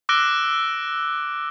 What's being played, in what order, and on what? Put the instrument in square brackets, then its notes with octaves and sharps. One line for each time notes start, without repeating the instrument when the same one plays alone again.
[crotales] D6 E6 F#6 A#6 D7 G7